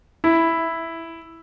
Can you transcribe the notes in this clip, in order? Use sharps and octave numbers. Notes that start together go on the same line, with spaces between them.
E4